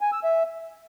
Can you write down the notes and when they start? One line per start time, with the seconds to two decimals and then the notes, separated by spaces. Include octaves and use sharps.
0.01 G#5
0.12 E6
0.24 E5